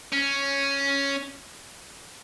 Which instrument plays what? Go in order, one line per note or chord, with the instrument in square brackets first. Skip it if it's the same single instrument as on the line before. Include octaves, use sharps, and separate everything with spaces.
[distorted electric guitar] C#4